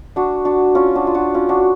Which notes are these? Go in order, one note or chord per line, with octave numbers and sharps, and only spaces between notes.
D4 F#4
D4 F#4
C#4 F4
D4 F#4
F4
D4 F#4
C#4 F4
D4 F#4